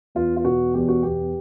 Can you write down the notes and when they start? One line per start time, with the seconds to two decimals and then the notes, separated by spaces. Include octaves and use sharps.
0.15 E2 F4
0.37 F4
0.45 B2 F#4
0.74 E2 G4
0.88 F#4
1.03 E2 G4